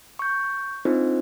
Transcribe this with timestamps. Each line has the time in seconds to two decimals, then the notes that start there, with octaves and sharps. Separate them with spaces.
0.19 C#6 G6
0.85 C4 D4 D#4 F4 A4 C5